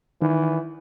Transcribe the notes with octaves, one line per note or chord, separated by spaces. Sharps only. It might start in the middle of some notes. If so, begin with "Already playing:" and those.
D#3 E3